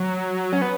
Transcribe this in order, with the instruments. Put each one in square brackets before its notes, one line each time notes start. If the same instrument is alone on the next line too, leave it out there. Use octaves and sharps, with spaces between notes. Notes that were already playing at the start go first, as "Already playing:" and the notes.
Already playing: [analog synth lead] F#3
C#4
B3